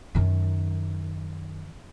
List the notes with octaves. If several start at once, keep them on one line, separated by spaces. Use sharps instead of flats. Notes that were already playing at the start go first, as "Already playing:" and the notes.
F#2 D#3